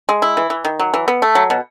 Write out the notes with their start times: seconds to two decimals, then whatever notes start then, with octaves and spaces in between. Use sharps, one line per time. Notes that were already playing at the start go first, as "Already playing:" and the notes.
0.09 G#3
0.22 E4
0.37 E3
0.50 E3
0.65 D#3
0.79 F#3
0.94 E3
1.08 B3
1.22 A3
1.35 F#3
1.50 B2